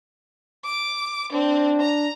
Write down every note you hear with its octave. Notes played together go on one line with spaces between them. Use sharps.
D6
C4 D4
A#5